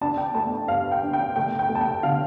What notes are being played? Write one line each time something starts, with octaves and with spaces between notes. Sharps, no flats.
D4 A5
G5
A3 A5
G2 F5
G5
D4
G5
A3 G5
G5
A3
A5
G5
D3 F5